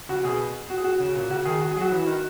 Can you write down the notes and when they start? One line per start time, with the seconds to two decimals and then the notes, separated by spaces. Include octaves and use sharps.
0.09 C#3 F#4
0.23 B2 G#4
0.70 F#4
0.78 G#4
0.84 F#4
1.00 C#3
1.15 A#2
1.30 C#3 F#4
1.45 D#3 G#4
1.61 F#4
1.71 G#4
1.77 F#3
1.81 F#4
1.92 E3
2.06 D#3